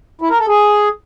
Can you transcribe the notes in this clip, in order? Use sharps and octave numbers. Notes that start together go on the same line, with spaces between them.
E4
A#4
A4
G#4